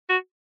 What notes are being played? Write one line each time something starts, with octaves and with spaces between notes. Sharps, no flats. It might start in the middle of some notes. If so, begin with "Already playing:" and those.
F#4